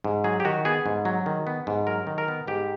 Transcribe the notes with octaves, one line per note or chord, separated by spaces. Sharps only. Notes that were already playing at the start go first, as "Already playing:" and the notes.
G#2
F#3 G#4
G4
D#3 F#4
B3 G#4
G#2
F#3
D#3
B3
G#2
F#3 A#4
D#3
A#4
B3
G#2 G4